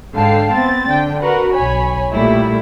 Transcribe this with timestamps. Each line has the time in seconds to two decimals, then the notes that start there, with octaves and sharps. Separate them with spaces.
0.14 G#2 D3 F5 G5 A5 C7
0.54 B3 C4 A6
0.88 D3 G5
1.22 F#4 A#4 B4 F#5
1.53 B1 C#5 G#5 B5
2.13 A#2 G3 A3 E4